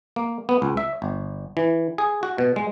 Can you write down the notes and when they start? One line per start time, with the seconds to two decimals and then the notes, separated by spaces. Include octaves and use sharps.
0.16 A#3
0.49 B3
0.62 C#2
0.77 E5
1.02 G1
1.57 E3
1.98 G#4
2.23 F#4
2.38 B2
2.56 G#3